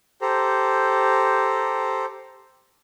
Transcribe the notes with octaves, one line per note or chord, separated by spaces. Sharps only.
G4 A4 C5 A#5